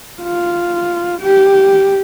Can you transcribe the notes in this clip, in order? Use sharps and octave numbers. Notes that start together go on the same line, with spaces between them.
F4
G4